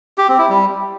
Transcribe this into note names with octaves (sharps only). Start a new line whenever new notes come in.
G4
C4
E4
G3